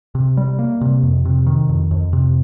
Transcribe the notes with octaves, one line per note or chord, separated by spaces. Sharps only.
C3
G3
A#3
C3
F2
C3
D#3
F2
F2
C3